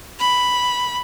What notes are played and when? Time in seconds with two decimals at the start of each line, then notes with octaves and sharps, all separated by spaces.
0.20 B5